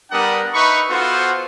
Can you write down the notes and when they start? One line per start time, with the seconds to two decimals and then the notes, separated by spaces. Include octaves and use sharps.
0.11 G3 B3 D4 A#4 F#5 D#6
0.54 D#4 B4 E5 B5 C#6
0.89 B3 F4 F#4 A4 C5